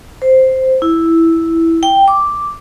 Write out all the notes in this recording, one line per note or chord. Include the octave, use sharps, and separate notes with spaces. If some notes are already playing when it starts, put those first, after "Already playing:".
C5
E4
G5
D6